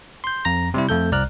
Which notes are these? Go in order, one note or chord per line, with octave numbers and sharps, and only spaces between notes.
C6 G6
F2 A#5 A#6
C3 G3 E4
F2 A3 A4 G6
C2 D5 A#5 F6 F#6